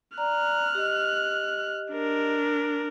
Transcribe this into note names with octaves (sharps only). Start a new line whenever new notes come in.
D5 A#5 F6 F#6
G4 D#5
D4 A#4